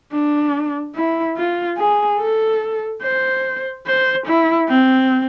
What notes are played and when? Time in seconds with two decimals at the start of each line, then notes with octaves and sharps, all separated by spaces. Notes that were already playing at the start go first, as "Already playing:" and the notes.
0.13 D4
0.96 E4
1.37 F4
1.78 G#4
2.20 A4
3.03 C5
3.86 C5
4.27 E4
4.69 C4